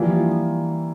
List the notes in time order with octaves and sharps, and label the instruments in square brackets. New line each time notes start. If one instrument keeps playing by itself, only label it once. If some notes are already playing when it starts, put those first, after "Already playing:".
Already playing: [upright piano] E3 G3 A#3 [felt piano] F3